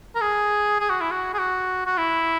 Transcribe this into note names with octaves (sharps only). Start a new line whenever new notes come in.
A#4
G#4
G#4
F#4
E4
F#4
G#4
F#4
F#4
E4